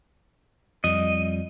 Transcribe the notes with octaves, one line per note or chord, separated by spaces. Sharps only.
F2 G3 D#5